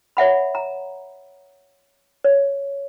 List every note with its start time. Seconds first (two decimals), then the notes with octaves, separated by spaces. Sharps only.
0.17 C#5 E5 F#5 B5
0.55 A#5
2.24 C#5